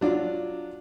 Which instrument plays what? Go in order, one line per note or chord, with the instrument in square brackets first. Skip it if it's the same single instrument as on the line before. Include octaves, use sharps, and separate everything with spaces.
[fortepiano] F#3 D4 F4